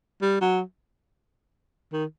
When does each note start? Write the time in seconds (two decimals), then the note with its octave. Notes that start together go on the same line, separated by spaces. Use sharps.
0.22 G3
0.41 F#3
1.93 D#3